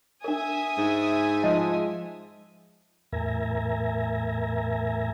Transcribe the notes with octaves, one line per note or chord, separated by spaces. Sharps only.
D4 A#4 E5 G#5 D#6
G#2
F3 G#3 D#5
E2 A2 A#4 E5 G#5 A#5